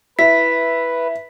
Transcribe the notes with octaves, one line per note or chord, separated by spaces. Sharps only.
E4 B4 B6